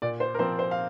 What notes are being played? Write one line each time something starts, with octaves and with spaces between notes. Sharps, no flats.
A#2 D5
C5
A#4
F3 C4 C5
C5
F5